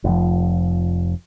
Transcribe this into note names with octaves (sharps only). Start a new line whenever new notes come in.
F1 F3